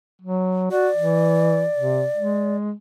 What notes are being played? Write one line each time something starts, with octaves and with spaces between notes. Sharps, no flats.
F#3
F#4 D5
E3
C3
G#3